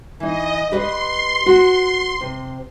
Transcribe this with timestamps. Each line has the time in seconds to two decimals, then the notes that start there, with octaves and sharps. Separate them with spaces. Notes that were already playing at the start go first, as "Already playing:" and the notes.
0.20 E3 D#4 D#5
0.72 G4 B4 D#5 C6
1.46 F#4
2.21 C3